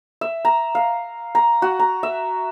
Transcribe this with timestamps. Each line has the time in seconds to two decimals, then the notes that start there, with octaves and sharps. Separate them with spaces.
0.21 E5
0.45 A#5
0.75 F5
1.35 A#5
1.62 F#4
1.79 A#5
2.03 E5